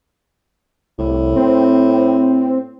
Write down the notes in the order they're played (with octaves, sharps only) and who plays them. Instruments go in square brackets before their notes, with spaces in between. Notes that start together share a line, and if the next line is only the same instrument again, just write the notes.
[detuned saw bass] C2 [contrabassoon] A2
[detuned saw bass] C4